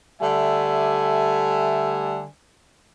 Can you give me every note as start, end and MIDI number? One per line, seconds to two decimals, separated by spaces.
0.21 2.25 50
0.21 2.25 55
0.21 2.25 57
0.21 2.25 76
0.21 2.25 80